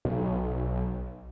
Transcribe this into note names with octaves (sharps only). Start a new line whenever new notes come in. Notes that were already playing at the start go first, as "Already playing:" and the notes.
B1